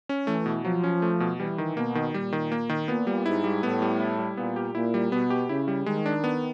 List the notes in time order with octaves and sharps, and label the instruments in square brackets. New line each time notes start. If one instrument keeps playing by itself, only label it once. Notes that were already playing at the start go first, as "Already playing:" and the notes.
[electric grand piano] C#4
[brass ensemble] E3 [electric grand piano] A3
[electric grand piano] B2
[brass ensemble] F3 [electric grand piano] F#3
[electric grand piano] C#4
A3
B2
[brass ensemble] E3 [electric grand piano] G3
[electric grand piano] D#3
[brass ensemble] B2 [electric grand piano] A#3
[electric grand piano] D#3
[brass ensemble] A#2 [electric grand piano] G3
[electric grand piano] D#3
A#3
D#3
[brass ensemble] A#2 [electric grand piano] B3
[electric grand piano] G3
[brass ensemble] G#2 [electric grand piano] E4
[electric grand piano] G3
[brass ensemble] A2 [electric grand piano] B3
[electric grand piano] G3
E4
G3
[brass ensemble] A#2 [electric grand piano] B3
[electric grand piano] G4
[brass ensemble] A#2 [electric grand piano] E4
[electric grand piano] G3
[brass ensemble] B2 [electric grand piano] B3
[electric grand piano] G4
[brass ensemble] C#3 [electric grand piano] E4
[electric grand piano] G3
[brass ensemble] D#3 [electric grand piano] G#3
[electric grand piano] D4
B3